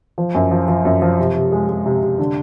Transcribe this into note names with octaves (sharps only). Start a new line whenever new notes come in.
F3
F#2
F3
F3
F#2
F3
C3
C3
G#3
G#3
C3
C3
D3